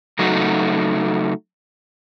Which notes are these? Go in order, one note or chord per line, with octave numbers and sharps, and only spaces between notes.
C#3 F#3 A3 D#4 F#4